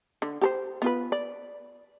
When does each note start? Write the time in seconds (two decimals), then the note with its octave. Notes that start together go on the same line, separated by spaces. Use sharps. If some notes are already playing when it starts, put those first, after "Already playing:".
0.22 D3
0.41 G4 A4 C5
0.82 B3 F4 B4
1.12 D5